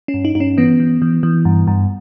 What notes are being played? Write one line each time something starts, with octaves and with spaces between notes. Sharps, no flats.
C#4
G2
D#4
G2 D#4
C#4
E3 B3
E3
E3
E3
G2
G2